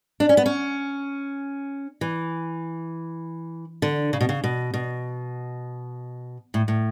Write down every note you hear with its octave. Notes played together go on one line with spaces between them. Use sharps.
D4
C#4
B3
C#4
E3
D3
C#3
B2
C#3
B2
B2
A2
A2